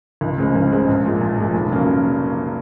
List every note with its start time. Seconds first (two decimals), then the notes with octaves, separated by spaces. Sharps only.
0.21 C#2
0.38 C#3 G#3 C4
0.55 C#2
0.71 C#3 G#3 C4
0.88 A#1
1.05 A#2 F3 G#3
1.21 A#1
1.38 A#2 F3 G#3
1.54 F1
1.71 C#3 F#3 A#3